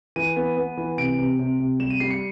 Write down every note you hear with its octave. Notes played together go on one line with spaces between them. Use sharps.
E3 D#7
B3
B3
E3
C3 D7
C3
C3
C3
G3 E7
D#7
G3 C7
C#7